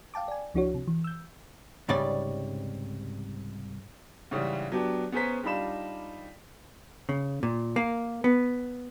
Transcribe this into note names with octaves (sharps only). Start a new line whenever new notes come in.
F5 G5 A5 D6
D5 G#5
C#2 F3 D4 E4 F#4 C#5
C3
E3
E6 G6
C2 G#2 C#3 G3 D5
G#2 C#3 E3 G3
F#3 B3 D4 G4
B3 C#4 G#4 C5 A#5 B6
G3 D4 D#4 F4 B5 E7
C#3
A#2
A#3
B3